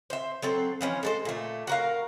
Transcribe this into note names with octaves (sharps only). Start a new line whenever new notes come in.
C5 E5
F#3 C4 A4
E3 F3 C#4
G#3 A4 C5
A#2 A3
F#4 A#4 F5